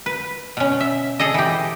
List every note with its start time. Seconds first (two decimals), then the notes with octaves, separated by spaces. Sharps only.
0.06 B4
0.57 B2 C#4
0.80 E5
1.20 G#4 A4 D#5
1.34 E3 G4